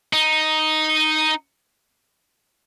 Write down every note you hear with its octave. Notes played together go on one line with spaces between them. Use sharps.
D#4